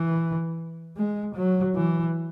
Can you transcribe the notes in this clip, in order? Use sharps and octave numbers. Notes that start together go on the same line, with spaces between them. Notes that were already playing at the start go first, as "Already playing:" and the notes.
Already playing: E3
G#3
F#3
E3